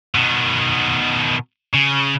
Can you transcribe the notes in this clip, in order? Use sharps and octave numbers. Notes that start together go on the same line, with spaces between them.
B2 D#3
C#3